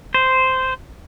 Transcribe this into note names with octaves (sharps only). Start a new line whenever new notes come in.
C5